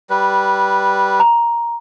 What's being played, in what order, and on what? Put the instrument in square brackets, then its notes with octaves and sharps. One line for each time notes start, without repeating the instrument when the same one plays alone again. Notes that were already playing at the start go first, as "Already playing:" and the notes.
[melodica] G3 B4
[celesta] A#5